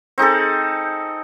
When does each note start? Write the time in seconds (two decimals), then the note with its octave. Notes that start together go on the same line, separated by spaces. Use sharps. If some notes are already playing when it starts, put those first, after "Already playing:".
0.18 C4 D#4 G#4 A4